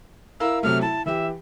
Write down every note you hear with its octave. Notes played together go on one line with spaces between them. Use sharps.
E4 A#4 F5 E6
C3 F#3 A3 F6
E4 A5
E3 G4 E5